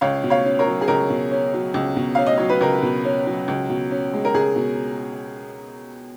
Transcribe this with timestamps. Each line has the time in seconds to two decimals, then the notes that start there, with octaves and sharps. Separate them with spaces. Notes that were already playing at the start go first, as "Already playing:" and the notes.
0.01 C#2 C#5 F5
0.24 B2
0.30 C#5 F5
0.45 C#4
0.59 A#4 C#5
0.67 F#3
0.81 G#4
0.88 C#2 A#4
1.10 B2
1.31 C#4
1.54 F#3
1.74 C#2
1.96 B2
2.15 C#4 F5
2.27 D#5
2.38 F#3 C#5
2.49 B4
2.61 C#2 A#4
2.83 B2
3.05 C#4
3.27 F#3
3.48 C#2
3.70 B2
3.91 C#4
4.13 G#3
4.25 A#4
4.34 C#2 G#4
4.56 B2